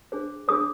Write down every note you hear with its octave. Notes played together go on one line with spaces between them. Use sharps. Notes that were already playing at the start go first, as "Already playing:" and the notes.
D4 G#4 C5
D4 G#4 C5 D#6